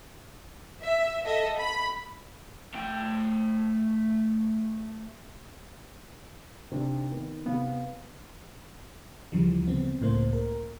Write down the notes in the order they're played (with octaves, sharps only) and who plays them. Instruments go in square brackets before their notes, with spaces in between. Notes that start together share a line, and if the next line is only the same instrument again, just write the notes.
[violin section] E5
A4 D#5 E5
B5
[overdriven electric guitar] A3 G5
[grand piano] C3 D4 D#4
D#3 B3
[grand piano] C3 F5 [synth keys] B3
[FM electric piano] D2 C#3 E3 F3 G3
C#3 B3 C4
C#2 A2 C#3 A3 A#3 C5
A#4